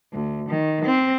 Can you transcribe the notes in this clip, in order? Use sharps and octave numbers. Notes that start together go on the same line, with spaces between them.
D2
D#3
C4